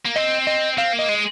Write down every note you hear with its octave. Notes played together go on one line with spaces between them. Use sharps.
A#3
C4 D#5
D#5
C4 F5
A#3
D#5
G#3